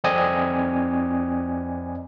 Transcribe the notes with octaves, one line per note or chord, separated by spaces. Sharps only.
F2 C4 D5 D#5 G#5 D#6